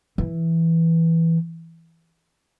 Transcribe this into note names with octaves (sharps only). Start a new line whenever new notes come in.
E3